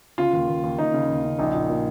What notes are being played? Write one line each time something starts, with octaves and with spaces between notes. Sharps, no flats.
C#3 F4
D#2
D#2
D#2
D#2 D#4
C#3
D#2
C#3
A#1 D#4
A#2
A#2